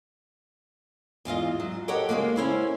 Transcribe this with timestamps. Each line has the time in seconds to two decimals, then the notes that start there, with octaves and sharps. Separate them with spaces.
1.25 E2 G#2 F4 D#5
1.60 F#3
1.88 G4 A4 A#4 C#5 D#5 F#5
2.09 C#3 E3 G#3 A#3
2.36 C#4 E4 C5